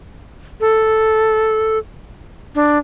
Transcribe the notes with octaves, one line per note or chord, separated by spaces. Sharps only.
A4
D4